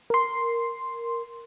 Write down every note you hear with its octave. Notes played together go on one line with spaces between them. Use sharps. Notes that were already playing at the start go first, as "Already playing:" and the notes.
A#4 C6